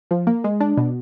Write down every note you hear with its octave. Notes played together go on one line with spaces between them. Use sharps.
F3
A#3
G#3
D4
B2